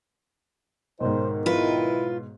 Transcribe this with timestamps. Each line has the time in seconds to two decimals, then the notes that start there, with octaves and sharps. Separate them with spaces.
1.00 B1 G#2 D#3 C5
1.46 E4 F4 B4